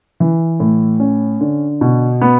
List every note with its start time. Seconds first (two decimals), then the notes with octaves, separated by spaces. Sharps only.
0.20 E3
0.60 A2
1.00 C#4
1.41 D3
1.81 B2
2.21 B3